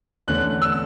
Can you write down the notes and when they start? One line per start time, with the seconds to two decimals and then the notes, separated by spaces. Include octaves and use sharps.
0.28 E2 D3 A3 C#4 F#6
0.62 E6